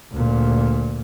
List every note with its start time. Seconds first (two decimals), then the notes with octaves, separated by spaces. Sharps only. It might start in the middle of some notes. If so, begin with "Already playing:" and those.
0.12 D2 A#2